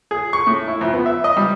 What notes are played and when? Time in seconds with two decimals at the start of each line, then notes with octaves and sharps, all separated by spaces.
0.11 G#4
0.33 C#6
0.47 A2
0.68 E4
0.81 F2
0.93 B3
1.06 E5
1.24 D#5
1.37 G3